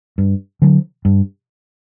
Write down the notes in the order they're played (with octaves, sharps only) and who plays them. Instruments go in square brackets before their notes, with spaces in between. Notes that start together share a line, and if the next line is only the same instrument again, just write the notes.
[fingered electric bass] G2
D3 F#3
G2